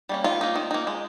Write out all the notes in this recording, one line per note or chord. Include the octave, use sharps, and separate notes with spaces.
G3 A#3 C#4
D#3 F4
A#3 D#4
D#3
A#3 D#4
G#3